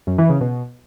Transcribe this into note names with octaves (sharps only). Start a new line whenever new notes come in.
F#2
E3
C#3
B2